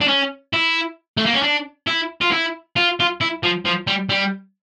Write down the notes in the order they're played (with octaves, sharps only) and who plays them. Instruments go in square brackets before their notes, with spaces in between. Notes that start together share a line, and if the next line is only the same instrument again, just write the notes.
[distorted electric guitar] D4
C#4
E4
A3
A#3
C#4
D4
E4
F4
E4
F4
F4
E4
F3
F3
G3
G3